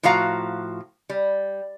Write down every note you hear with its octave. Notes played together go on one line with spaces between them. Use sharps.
A2 F3 F#4 F5 A#5
G3